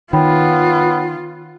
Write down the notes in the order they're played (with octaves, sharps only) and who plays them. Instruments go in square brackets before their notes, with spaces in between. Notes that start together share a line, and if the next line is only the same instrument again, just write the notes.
[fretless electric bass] D#3 [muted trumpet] B3 [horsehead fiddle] F4 [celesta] C#5 G5 B5